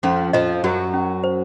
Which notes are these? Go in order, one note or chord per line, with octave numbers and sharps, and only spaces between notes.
F2 F3 C#4
F2 F3 D#5
F#2 F#3 F#4
C#4
C5